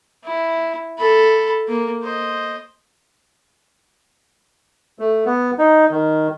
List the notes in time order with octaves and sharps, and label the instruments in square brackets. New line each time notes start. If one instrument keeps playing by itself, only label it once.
[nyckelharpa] E4
A4 B5
A#3
C5 D#5
[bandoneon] A3
B3
D#4
D#3